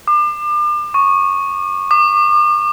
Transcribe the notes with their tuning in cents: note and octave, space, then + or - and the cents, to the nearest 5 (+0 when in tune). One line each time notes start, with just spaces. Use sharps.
D6 +35
C#6 -5
D6 +45